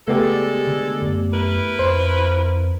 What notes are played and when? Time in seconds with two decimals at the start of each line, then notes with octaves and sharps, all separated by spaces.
0.08 C#3 G#3 A3 B3 G4 A4 D5
0.67 D3
1.02 F#2
1.32 E4 A#4 B4
1.79 F2 C5